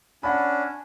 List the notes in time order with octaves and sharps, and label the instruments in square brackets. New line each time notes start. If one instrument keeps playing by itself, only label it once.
[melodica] C#4 D4 [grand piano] F#5 B5